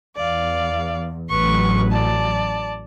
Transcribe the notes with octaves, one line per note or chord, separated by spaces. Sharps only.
E2 D5 F5
A1 F#3 B4 C#6
D5 A5